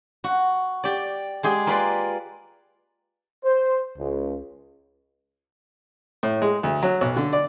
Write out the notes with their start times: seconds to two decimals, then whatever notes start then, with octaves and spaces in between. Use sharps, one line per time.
0.24 F#4
0.84 G4 D5
1.43 G#3 G4 G#4
1.67 A#3 F4 B4 D5
3.45 C5
3.98 C#2
6.23 A2
6.42 G#3
6.63 D2
6.83 F#3
7.01 B1
7.17 D3
7.33 D5